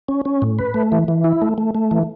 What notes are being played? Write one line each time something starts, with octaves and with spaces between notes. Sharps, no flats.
C#4
C#4
A2
B4
A3
E3
E3
E4
A3
A3
A3
E3